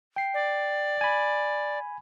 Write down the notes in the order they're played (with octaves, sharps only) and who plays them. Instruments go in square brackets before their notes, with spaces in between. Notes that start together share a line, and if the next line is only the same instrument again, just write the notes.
[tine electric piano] G5 C7
[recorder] D5
[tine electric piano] G#5 B5